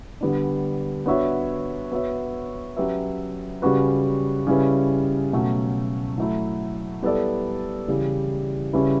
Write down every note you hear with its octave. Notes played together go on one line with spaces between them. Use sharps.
D3 G3 B3 D4
B3 D4 F#4 C#5 E5
B3 F#4 C#5 E5
F#3 C#4 G4 B4 E5
C#3 G3 C#4 F#4 B4
C#3 G3 C#4 E4 B4
B2 F#3 A3 C#4 F#4
F#3 A3 E4
G3 B3 E4 A4 D5
C#3 E3 G3
C#3 G3 C#4 E4 B4